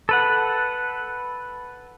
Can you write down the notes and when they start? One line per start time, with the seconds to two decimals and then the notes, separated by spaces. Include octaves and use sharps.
0.09 A4 B4 F#5